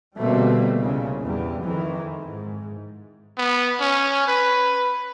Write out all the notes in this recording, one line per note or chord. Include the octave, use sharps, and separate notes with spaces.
B2 D3 G3 A3 A#3 C4
C2 A#2 C#3
E2 G3
F2 D#3 E3
G#2
B3
C#4
B4